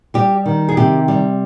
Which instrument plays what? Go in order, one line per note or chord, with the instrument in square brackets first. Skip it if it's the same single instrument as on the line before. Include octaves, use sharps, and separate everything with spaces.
[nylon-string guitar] G3 G4
D#3
G#4
C3 G4
G3